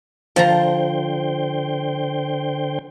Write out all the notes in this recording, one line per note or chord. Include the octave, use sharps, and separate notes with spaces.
D3 F3 C5 G5 A5 A#5